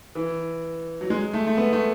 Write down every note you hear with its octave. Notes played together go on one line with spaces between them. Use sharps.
E3
F#3
G#3
A3
A3
B3
A3